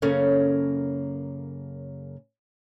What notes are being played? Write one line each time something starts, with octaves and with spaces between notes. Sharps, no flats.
F#2 C#3 A#3 C#4 A4 C#5